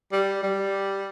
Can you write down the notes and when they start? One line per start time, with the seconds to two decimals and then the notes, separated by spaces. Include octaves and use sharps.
0.12 G3
0.43 G3